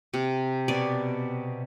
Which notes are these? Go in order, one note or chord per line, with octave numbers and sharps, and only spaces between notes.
C3
B2 B3 D5 G#5